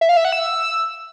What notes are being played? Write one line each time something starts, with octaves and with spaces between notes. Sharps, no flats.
E5
F5
E5
F#5
E6